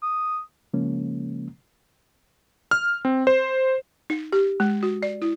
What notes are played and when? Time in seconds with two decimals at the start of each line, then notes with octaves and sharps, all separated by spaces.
0.03 D#6
0.73 C#3 F3 G#3 A#3 C#4
2.71 F6
3.05 C4
3.27 C5
4.10 D#4
4.32 G4
4.60 G#3
4.83 F#4
5.03 D5
5.22 E4